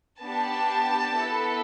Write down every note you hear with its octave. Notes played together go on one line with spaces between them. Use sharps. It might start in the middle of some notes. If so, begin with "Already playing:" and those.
B3 D4 G4 A5
B3 E4 A4